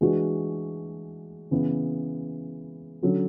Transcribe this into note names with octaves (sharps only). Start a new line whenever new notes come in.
E3 G#3 D4 F#4
C#3 E3 B3
D3 F#3 C#4